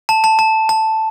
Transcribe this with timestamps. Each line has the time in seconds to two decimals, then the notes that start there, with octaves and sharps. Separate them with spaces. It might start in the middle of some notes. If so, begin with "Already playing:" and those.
0.09 A5
0.24 A5
0.39 A5
0.69 A5